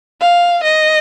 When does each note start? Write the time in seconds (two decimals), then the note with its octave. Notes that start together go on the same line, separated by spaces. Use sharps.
0.21 F5
0.64 D#5